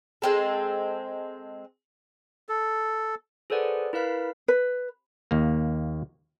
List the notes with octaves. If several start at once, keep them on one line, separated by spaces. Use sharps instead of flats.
G#3 C4 A4
A4
G#4 A4 B4 C5 D5 F#5
E4 A#4 B4 F5 B6
B4
D#2 A#3